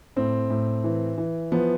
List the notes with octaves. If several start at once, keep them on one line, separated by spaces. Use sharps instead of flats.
A2 C4
A2
E3
E3
F3 B3